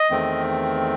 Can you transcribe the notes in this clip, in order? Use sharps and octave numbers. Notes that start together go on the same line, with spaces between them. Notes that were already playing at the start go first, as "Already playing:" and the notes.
Already playing: D#5
E2 D#3 A3 C4